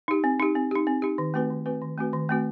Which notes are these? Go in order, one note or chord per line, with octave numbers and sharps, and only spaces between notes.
D#4 G4
C4
D#4 G4
C4
D#4 G4
C4
D#4 G4
D#3
A3 C4 F#4 B4
D#3
A3 C4 F#4 B4
D#3
A3 C4 F#4 B4
D#3
A3 C4 F#4 B4